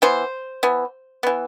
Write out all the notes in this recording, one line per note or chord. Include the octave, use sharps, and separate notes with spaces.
E3 B3 C5
E3 B3
E3 B3